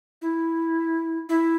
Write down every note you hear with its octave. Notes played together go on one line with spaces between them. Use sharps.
E4
E4